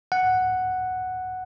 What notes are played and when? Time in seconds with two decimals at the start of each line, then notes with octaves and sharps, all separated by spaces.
0.12 F#5